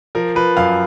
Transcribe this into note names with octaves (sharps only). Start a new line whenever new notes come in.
F3 A#4
F3 B4
F#2 F5